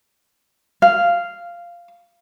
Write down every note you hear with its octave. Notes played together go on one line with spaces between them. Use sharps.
F5